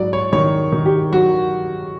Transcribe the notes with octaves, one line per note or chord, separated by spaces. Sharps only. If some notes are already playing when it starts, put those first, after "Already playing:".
Already playing: G#2 F#3 D5
C#5
D#3 C#5
D#3
G4
F#3 F#4